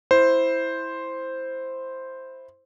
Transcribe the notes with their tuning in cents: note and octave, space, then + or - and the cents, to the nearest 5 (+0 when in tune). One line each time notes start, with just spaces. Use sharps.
E4 +0 C5 +0